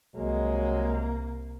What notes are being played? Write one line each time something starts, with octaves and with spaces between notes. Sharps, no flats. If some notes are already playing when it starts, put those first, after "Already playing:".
C2 F#3 G#3 A#3